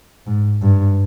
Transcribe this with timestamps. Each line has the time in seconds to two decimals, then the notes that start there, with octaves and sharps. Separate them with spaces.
0.27 G#2
0.62 G2